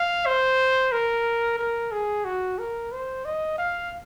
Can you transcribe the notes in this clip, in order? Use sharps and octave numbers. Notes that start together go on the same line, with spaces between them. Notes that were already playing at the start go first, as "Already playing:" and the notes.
Already playing: F5
C5
A#4
A#4
G#4
F#4
A#4
C5
D#5
F5